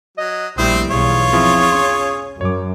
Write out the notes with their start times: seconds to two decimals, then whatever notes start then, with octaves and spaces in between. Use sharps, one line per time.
0.18 F#3 D#5
0.58 A#1 G3 A3 C4 E4 C5 D#6
0.91 B1 E2 F4 G#4 C#5
1.33 F3 C4 E4 G#4
1.72 C#4 C6
2.41 F#2 C#5 D6